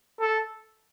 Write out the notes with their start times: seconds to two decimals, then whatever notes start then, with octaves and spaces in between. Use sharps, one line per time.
0.21 A4